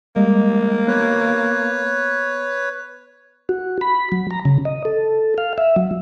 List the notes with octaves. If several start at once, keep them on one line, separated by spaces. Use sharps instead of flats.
G3 G#3 A#3 D#5
B3 B4 C#5
F#4
B5
F#3
A#5
C#3
D#5
A4
F5
E5
F#3